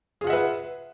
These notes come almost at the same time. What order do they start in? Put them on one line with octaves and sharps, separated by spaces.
G#4 F4 F#5 E5 B4